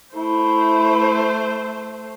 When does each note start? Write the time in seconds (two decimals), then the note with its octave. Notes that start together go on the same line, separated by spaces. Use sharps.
0.15 A3 E4 C5